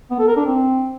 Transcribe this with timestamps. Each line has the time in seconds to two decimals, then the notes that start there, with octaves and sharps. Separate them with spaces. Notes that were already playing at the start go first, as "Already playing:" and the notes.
0.11 B3
0.19 A4
0.28 A#4
0.36 D4
0.45 C4